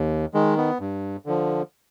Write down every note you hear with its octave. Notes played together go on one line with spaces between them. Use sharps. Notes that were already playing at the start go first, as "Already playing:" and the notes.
Already playing: D#2
D#3 G#3
B3
G2
D3 F3